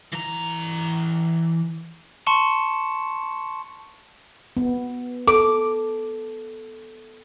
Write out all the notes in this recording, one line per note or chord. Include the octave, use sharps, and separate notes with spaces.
E3 A#5
A5 C6 C#6 C#7 E7
B3
A4 D6